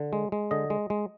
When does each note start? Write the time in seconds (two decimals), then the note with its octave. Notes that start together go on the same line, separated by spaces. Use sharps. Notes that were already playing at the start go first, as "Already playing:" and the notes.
Already playing: D3
0.13 G#3
0.32 G#3
0.51 D3 D#5
0.70 G#3
0.90 G#3